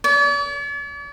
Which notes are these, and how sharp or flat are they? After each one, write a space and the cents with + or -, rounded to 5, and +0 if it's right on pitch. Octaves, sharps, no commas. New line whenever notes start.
D5 -45